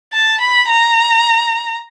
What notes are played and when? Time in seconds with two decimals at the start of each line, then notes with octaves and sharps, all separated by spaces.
0.13 A5
0.40 B5
0.69 A#5